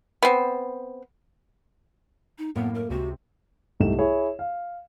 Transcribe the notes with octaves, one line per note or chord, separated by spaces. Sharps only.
B3 C4
D#4
F#2 A2 A#3 B3
A#4
C#2 C3 F#4
C2 G#2 A3 G4 E7
E4 G#4 C#5
F5